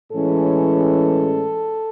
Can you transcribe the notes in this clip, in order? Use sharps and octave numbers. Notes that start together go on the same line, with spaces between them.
A2 E3 G#3 C#4 A4